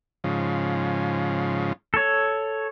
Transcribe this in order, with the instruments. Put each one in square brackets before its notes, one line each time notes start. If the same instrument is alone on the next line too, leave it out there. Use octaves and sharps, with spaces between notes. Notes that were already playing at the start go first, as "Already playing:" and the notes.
[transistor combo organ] G#2 C#3 F3
[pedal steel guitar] A4 C#5